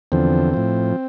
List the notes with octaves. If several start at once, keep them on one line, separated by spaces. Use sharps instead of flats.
E2 D3 F3 C4
A2 F3